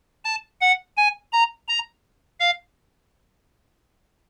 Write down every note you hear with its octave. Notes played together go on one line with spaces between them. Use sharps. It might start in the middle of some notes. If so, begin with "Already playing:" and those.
A5
F#5
G#5
A#5
A#5
F5